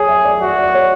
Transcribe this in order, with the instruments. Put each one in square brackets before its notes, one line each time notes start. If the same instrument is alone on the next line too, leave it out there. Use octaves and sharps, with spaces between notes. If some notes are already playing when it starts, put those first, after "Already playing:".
Already playing: [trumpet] G#4 [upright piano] C#5
[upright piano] E5
D5
[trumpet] F#4 [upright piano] E5
[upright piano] D5
C#5